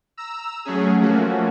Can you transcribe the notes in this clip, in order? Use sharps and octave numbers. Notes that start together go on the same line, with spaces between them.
A#5 E6
F#3 A3 C#4 G#4
F3 A3 A#3 C#4 F#4